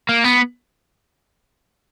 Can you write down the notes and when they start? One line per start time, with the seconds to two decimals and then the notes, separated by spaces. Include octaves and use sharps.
0.09 A#3
0.24 B3